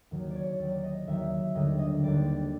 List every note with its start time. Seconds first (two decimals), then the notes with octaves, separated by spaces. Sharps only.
0.11 D#2 D#3 F#3
0.31 C#5 D5
0.60 D#2 D#3 F#3 D5
0.84 D#5
1.08 D#2 D#3 F#3 E5
1.31 E5
1.55 D#2 D3 G3 D#5
1.79 D#5
2.03 D#2 D3 G3 D5